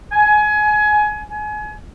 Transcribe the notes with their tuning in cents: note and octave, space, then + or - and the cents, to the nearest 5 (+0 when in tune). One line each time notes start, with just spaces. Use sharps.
G#5 +25
G#5 +30